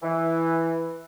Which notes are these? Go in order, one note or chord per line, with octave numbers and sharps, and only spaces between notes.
E3